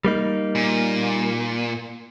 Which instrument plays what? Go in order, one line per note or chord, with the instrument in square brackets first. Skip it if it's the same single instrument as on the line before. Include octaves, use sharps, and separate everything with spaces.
[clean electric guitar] G3 A#3 D#4
[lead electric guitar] A#2